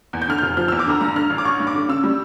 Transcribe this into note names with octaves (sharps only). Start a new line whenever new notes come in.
E2
G6
D3 F6
F1 G6
F3 F6
E6
E2
D6
D3 A#5
G2 A#5
D3 F6
A1
D6
A1 C#6
G2
D6
D3
C#3 E6
G3